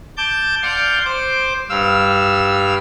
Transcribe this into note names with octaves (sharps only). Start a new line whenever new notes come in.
A5 D6 G6
D5 F5 F#5 C6 G6
C5 D6
G2 F5 E6